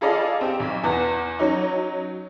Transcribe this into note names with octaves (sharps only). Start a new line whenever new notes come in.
F4 G#4 A4 D5 D#5 F5
C4 G4
B1
E2 B3
F#3 C#4 D#4